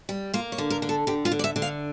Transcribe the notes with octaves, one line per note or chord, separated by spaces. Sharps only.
G3
A#3 F4
C#5
D3
A#4
D3
A4
D3 G4
F4
D3
D5
E5
D3
F5